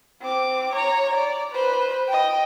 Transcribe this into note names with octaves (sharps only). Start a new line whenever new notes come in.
C4 D6
C#5 A#5
D5
B4 C5
D#5 G5